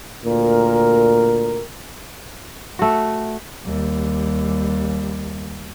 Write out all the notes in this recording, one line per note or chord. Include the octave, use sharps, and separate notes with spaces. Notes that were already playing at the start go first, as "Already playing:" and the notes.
D2 A#2 A#4
A3 F#4
D#2 G3